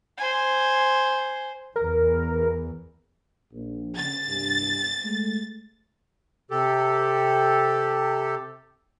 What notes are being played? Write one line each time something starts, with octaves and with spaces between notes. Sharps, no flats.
C5 G#5
E2 E3 A#4
A#1
C#3 A6
C2 G2
G#3 A3
C3 G4 A4